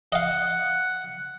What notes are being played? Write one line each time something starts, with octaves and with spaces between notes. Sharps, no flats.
D#5 F5 F#5